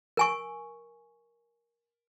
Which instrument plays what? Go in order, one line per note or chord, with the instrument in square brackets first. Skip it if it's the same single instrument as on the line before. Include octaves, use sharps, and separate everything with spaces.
[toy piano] A#4 G#5 C#6